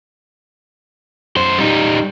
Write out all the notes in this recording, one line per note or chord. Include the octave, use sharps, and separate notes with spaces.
F#2 C5
G3 D#4